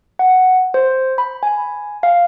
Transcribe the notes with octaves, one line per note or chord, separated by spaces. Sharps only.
F#5
C5
B5
G#5
F5